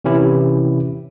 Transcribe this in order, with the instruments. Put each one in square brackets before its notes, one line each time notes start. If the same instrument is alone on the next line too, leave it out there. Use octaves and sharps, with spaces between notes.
[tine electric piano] C3 E3 C#4 E4 G4